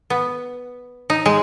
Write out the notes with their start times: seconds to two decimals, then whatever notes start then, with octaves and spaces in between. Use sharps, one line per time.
0.10 B3
1.10 D#4
1.26 G#3